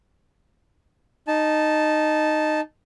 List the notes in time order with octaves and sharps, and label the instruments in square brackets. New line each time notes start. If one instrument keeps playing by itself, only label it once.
[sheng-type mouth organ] D#4 A5